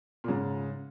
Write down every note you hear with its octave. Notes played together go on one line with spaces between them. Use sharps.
A#2
G#2 C#3